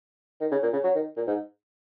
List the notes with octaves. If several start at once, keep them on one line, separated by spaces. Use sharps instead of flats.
D#3
C#3
A#2
C#3
F#3
D#3
A#2
G#2